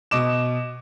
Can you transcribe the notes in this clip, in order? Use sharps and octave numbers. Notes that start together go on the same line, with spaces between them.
B2 D#5 D6 E7